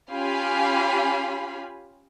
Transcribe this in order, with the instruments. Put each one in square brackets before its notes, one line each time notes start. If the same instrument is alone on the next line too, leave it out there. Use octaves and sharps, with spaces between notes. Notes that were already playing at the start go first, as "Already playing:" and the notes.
[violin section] C#4 F4 G4 F5 G#5 B5